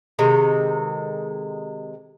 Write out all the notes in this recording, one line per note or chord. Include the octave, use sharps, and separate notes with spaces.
C3 D#3 G#3 A4